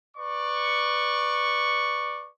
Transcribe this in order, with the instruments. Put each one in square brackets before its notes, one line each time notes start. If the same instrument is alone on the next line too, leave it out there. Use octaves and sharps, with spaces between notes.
[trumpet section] B4 D5 C#6